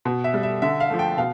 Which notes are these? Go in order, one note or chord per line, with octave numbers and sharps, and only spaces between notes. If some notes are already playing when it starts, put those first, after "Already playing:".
B2
E5
G3
E5
D3 E5
F5
F3 A3
G5
B2 F5